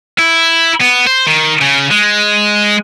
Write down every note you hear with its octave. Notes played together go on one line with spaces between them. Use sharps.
E4
B3
C5
D#3
C#3
G#3